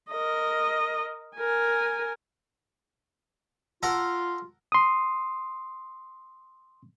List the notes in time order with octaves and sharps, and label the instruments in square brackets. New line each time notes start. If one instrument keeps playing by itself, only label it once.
[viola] A#4 D#5
A#4 G#5
[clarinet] F4 [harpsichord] A4 A#4 F#5
[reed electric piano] C6 D#6